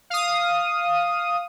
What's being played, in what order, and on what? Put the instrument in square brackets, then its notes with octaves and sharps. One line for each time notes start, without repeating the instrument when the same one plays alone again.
[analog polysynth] F5 D#6